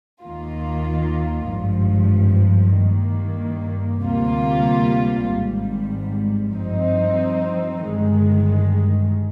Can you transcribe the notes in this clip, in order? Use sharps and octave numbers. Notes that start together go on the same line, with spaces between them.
D#2 D#3 A#3 F4
G#1 G2 F3
G2 D#3 A#3
D2 C3 G3 A#3 F4
G#1 G#2 G3
G2 F3 C4 D#4
G1 G2 D#3 G#3